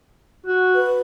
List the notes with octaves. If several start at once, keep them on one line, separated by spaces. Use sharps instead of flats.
F#4
B4